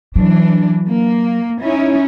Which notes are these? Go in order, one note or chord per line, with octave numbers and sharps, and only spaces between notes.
E3 F#3 D4
A#3
C#4 D#4 E4